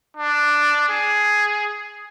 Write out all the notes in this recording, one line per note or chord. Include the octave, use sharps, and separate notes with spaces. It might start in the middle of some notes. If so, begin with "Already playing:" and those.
D4
G#4